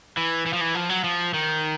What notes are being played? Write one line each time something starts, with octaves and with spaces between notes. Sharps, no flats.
E3
E3
F3
E3
F3
F#3
F3
D#3